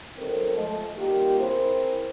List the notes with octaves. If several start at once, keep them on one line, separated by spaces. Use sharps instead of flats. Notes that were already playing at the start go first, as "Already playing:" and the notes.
F#2 D#3 C4 A4 A#4 C5
F3 G#3 A3 F4 A4 D#5
D#3 G3 A#3 F4 G4
C4 E4 G#4 A#4 C5